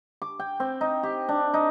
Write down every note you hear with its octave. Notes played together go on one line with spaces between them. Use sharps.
D6
G5
C4
D#4
G4
D4
D#4